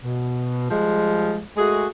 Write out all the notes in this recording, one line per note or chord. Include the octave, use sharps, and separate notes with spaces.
B2
F3 G3 G#3
G#3 A3 F#4 G#4